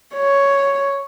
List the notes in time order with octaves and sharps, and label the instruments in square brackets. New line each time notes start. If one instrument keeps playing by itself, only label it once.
[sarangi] C#5